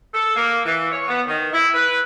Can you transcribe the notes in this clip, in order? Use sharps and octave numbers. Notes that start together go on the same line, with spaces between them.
A4
A#3
E3
C#5
B3
D#3
E4
B4